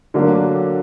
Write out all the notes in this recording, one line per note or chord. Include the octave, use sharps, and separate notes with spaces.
D3 F#3 A#3 D4